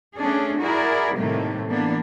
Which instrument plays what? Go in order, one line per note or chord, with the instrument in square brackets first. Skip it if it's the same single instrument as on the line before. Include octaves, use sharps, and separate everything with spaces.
[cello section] A3 C#4 D4 G#4
E4 F#4 G#4 A#4 D5
A2 C3 D#3 G3 A3 A#3
E3 A#3 B3 D4